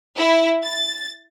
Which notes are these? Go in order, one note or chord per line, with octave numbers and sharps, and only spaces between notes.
E4
A6